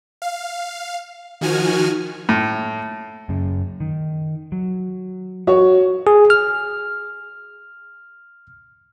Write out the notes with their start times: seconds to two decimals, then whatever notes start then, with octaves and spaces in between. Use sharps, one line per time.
0.22 F5
1.41 D#3 F3 F#4 G#5 F6
2.29 A2
3.29 F#2 C#3
3.80 D#3
4.52 F#3
5.47 F#4 C#5
6.07 G#4
6.30 F6